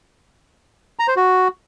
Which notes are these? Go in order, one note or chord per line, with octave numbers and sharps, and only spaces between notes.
A#5
C5
F#4